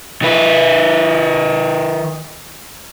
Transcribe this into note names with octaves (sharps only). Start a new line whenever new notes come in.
D#3 B4